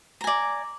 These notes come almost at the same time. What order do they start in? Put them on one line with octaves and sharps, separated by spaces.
A#5 G#5 D5